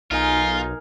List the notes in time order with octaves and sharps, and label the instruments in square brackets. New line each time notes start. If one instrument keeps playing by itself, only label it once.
[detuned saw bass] B1 [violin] D#4 [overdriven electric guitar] F4 [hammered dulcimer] G#4 A#4